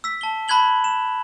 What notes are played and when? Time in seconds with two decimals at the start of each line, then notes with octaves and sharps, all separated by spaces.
0.04 E6 B6
0.21 A5 G7
0.48 A5 B5 F#6 G#6 F#7 G7
0.84 E7